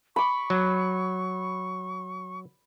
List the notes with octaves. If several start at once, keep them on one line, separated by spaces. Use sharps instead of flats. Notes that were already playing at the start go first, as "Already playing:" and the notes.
B5 C#6 D6
F#3